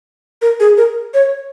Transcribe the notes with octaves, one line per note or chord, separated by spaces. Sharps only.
A#4
G#4
A#4
C#5